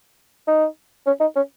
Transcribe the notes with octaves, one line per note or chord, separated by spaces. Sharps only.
D#4
C#4
D#4
C#4